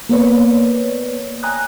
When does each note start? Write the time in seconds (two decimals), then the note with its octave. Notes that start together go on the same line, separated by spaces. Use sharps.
0.09 A#3 B3 B4 C#5 D5
1.43 G5 G#5 A#5 D#6 F#6